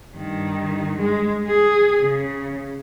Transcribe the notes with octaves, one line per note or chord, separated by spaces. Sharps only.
G2 D#3
G#3
G#4
C#3